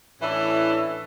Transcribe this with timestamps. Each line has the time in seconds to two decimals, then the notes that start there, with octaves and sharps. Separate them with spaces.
0.22 A2 E3 C#4 D4 E4 A4